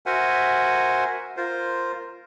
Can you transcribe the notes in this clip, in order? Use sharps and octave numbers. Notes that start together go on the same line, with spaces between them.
F#4 A#4 C5 E5 F#5 G#5
F4 A#4 C5